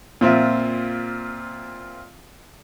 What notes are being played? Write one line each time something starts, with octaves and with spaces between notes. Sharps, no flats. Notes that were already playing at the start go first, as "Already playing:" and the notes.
A#2 C4 F4 E5